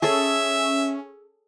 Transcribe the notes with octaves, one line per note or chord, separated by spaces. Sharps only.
C#4 G#4 A4 C#5 E5